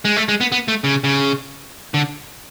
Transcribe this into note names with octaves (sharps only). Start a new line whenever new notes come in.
G#3
A3
G#3
B3
B3
A3
C#3
C#3
D3